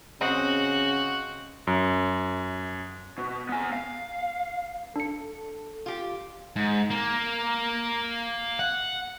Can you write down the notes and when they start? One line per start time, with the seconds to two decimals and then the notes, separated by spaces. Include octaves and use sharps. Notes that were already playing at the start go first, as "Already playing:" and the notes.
0.21 C#3 C4 F#4 D#5
1.67 F#2
3.18 B2
3.49 B3 G#5
3.72 F5
4.96 D4 A4 C#7
5.86 F4 G4
6.56 G#2
6.90 A#3
8.59 F#5